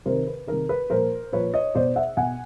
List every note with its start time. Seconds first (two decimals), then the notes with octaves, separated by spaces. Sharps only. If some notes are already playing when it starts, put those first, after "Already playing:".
0.06 C3 D#3 A#4 C5
0.27 B4
0.47 C3 D#3 A#4
0.69 B4
0.90 A#2 F3 A#4 C5
1.32 A#2 F3 B4 C#5
1.54 C#5 D#5
1.75 B2 C5 D5
1.96 E5 F#5
2.17 B2 F#5 G#5